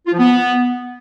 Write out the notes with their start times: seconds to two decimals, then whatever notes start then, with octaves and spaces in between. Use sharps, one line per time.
0.07 F4
0.13 F3
0.19 B3